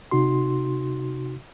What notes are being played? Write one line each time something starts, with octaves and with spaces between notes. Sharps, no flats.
C3 D#4 F#4 C6